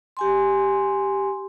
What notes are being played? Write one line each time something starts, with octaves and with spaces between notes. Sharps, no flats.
G4 G#5 C6